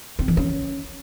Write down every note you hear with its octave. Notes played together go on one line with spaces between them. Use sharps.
C4
E3
C#4